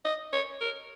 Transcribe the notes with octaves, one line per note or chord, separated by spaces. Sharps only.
D#5
C#5
A#4